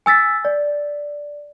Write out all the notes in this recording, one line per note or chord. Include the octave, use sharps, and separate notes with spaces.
G#5 E6 A6 B6
D5